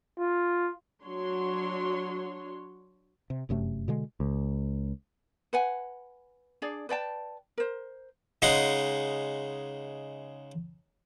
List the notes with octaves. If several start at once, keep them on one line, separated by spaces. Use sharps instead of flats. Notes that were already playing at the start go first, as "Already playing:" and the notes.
F4
F#3 D4 F#4 C#5 C6
C3
F1 F#2 C3 A3
B2 D3 G#3
C#2
B4 F#5 G#5
D4 G#4 D5
B4 D5 G5 A5
A#4 C5
C#3 G#3 D#4 F#5 C6